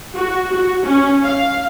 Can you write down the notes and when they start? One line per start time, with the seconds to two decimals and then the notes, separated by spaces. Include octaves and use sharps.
0.15 F#4
0.52 F#4
0.84 C#4
1.23 F5